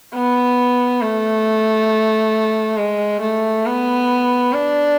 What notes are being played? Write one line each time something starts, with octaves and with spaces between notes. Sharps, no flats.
B3
A3
G#3
A3
B3
D4